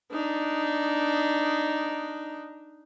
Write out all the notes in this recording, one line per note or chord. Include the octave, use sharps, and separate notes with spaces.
D4 D#4